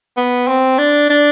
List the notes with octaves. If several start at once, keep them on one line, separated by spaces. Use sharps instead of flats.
B3
C4
D4
D4